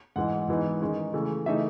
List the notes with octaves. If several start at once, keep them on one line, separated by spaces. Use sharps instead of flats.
G#2 E3 G#3 F#5
G#2 E3 B3 D#4
D#3 G#3 C#4
C#3 E3 A3 C#4
C#3 E3 A3 D#4 E5